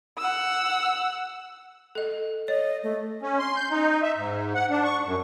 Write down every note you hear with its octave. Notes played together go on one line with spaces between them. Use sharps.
F#5 E6
A4 D#5
C#5 D#5
A3
C#4
C6
G6
D#4
E5
G#2
F#5
D4
C#6
F#2